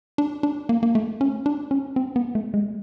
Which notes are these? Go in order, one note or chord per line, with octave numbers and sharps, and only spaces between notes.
D4
D4
A#3
A#3
A3
C#4
D4
C#4
C4
B3
A3
G#3